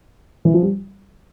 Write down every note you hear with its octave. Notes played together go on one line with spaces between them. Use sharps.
E3
F3
G3